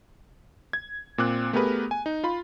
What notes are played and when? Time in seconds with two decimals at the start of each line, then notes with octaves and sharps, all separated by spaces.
0.73 G#6
1.18 A#2 C4 D6 F#6
1.53 A3 B3 G4 G#4 A#4 B4
1.91 G#5
2.06 D#4
2.24 F4 B5